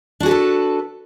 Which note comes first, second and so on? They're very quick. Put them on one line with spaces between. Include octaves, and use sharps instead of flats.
D4 F#4 G#4 B4 A4